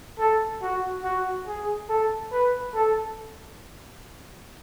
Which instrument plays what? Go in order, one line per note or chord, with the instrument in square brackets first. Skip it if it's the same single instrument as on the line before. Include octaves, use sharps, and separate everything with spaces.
[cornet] A4
F#4
F#4
G#4
A4
B4
A4